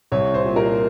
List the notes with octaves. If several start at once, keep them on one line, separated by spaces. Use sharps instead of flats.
C2 C#5
C5
A#2
A#4